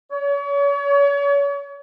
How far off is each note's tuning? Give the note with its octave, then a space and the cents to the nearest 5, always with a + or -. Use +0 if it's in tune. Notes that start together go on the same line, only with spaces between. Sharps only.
C#5 +35